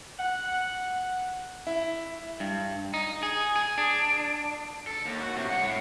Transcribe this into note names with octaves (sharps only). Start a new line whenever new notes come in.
F#5
E4
G2
D#4
G#4
G#4
D4
A4
D#2
F#4
A2 C3
G2 F#5
A2